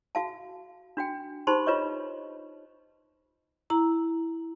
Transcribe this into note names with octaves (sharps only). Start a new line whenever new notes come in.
F#4 F5 A5
D4 F#4 G5
D#4 G4 C5 A5 B5 C6
F4 B4 C#5 D#5 C#6
E4 A#5